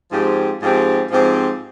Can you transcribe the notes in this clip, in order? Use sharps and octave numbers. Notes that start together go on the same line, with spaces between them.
G#2 F3 C4 G4
G#2 F3 C4 G4
G#2 F3 C4 G4